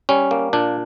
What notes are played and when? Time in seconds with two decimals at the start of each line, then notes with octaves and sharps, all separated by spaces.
0.09 G3 C#4
0.31 A#3
0.53 A#2 D4